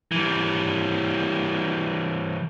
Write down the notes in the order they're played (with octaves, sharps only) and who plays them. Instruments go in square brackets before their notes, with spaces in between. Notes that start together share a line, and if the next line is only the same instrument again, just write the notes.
[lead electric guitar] E3 G3